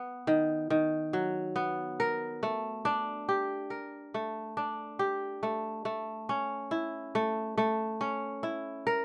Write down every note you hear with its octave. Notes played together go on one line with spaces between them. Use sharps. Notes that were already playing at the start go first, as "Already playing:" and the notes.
Already playing: B3
D#3
D#3
F#3
B3
A#4
A3
D4
G4
A#4
A3
D4
G4
A3
A3
C#4
E4
A3
A3
C#4
E4
A#4